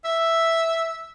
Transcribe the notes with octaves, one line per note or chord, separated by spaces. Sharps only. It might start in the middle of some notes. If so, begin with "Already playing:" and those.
E5